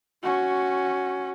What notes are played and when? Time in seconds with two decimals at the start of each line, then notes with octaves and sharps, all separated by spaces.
0.23 C#4 F#4